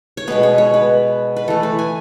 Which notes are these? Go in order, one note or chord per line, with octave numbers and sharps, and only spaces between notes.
C#5
B2 G#3 B3 B4
C#5
C#5
B4
B4
E3 A3 A4
B4
G#5